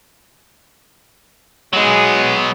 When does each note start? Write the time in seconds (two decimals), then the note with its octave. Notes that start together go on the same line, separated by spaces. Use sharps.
1.73 F#3 G#3 B3 G#4